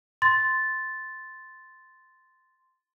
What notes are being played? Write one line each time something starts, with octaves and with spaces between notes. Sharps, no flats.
C6 A6